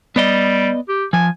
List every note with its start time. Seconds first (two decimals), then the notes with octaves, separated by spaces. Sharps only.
0.16 G3 B3 D5 D#5
0.88 G4
1.13 F3 G#5